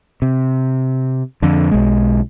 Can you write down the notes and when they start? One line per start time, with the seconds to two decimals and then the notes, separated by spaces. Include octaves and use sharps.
0.22 C3
1.42 F2 D3
1.71 B1 G#3